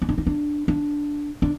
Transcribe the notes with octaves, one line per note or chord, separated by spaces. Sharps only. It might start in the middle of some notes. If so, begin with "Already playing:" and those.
C#4
D4
D#4
D4
D4
D4